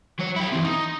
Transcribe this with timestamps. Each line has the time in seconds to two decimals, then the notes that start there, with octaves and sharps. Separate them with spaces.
0.19 F#3 C#5
0.36 E4 G4
0.52 E3 C4
0.65 D#4